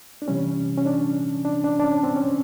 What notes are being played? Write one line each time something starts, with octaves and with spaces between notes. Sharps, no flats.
D4
C3 E3 G3 C#4
C#4
D4
D4
D4
D4
C#4
C4
C#4